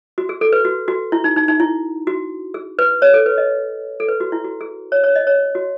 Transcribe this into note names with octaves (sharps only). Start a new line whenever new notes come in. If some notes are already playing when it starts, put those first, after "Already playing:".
F#4
G#4
A4
B4
F#4
F#4
E4
D#4
D#4
D#4
E4
F#4
G#4
B4
C#5
A4
B4
D#5
A4
B4
F#4
E4
F#4
G#4
C#5
C#5
D#5
C#5
F#4